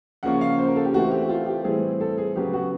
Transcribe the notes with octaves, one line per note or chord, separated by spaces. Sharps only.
C#3 F3 A#3 C#4 F#5
F5
C5
A#4
A4
G4
E3 A3 C4 F#4
G4
F4
G4
A2 E3 G3 C4 G#4
A4
G#4
C#3 F#3 B3 G4
F#4